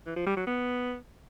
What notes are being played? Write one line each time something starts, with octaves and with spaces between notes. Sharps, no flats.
E3
F3
G3
F#3
B3